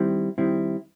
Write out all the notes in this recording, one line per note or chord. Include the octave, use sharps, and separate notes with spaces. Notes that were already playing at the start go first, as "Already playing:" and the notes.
Already playing: D#3 G3 C4 E4
D#3 G3 C4 E4